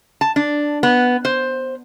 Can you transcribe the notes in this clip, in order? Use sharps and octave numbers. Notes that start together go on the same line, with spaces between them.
A5
D4
B3
C5